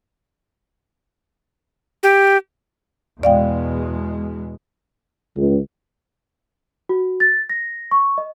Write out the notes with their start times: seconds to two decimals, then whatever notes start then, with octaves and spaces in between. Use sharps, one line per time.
2.03 G4
3.23 E2 B2 G#3 D5 F5 G5
5.36 C#2
6.89 F#4
7.20 A6
7.50 A#6
7.91 C#6
8.18 D#5